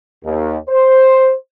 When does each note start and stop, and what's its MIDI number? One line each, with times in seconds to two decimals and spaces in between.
0.24 0.57 39
0.69 1.34 72